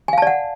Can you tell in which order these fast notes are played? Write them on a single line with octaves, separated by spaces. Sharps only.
G#5 F5 A5 D5 F#5